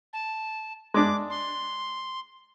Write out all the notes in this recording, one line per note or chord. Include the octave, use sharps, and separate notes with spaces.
A5
G#3 D4 D6
C6